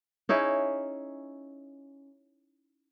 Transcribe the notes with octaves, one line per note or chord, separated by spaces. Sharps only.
C#4 D#4 E4 G#4